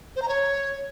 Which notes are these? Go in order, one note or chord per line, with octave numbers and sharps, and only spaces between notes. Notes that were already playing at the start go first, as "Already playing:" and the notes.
C5
A#5
C#5